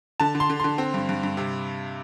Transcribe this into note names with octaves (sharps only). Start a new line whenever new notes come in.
D3 A5
D3
C6
D3
D3 C6
C4
G2
G2
G2
C3